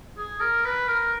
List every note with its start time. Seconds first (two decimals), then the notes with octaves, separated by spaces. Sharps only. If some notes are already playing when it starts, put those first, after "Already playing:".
0.17 G#4
0.41 A#4
0.65 B4
0.88 A#4